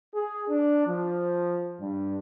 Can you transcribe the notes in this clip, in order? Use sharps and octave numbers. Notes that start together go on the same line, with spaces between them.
G#4
D4
F3
G2